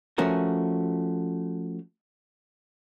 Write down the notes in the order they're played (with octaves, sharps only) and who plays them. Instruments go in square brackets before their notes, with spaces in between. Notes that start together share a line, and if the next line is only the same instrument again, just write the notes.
[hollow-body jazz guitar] F3 A3 C#4 F#4 A#4